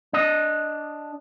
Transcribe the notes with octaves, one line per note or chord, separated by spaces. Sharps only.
D4 D#5